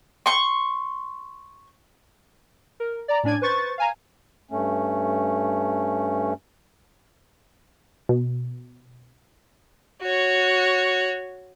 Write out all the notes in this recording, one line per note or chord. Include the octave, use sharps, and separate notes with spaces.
C6 C#6
A#4
D5 A#5
A2 C#4 D4 D5 G#5 G#6
B4 C5 C#6 A6
F5 G#5 A#5
G2 A3 C#4
B2
F#4 C#5